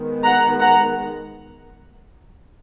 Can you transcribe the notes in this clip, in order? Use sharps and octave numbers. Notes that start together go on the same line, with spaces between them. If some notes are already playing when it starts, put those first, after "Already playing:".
Already playing: D#3 G#3 B3
F#5 A#5
F#5 A#5